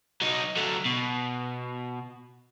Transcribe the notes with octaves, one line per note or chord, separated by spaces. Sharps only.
F#3 D#4
F#3 A3
B2